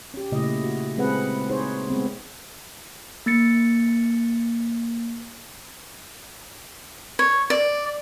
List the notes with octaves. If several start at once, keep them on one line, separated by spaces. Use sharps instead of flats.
C#4 G4
A#2 C#3 A3 E4 D#5
F#4
G#3 C4 G#4 B4 F#5
D#4 G#4 C5 C#5
G#3 B3 C4
A#3 A6 C#7
C#5
D5